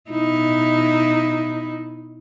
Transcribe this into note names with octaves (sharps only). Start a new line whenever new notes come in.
B2 D#4 E4